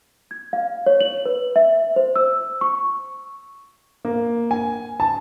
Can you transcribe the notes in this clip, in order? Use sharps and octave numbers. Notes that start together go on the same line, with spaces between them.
G#6
F5
C#5
F#7
B4
E5
C5
E6
C#6
A#3
G#5
A5